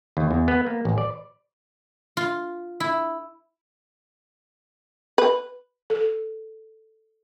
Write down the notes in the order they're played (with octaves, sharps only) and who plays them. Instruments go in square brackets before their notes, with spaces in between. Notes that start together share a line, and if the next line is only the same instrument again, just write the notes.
[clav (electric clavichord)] D#2
E2
B3
A#3
A1
D5
[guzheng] F4
E4
[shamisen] B4
[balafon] A4